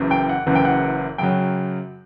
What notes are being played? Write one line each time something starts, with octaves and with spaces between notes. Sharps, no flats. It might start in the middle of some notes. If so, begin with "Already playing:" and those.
Already playing: F#1 F#2 C#3 E3
G5
F#5
F#1 F#2 C#3 E3 F#5
G5
F#5
F#2 C#3 F#3 G5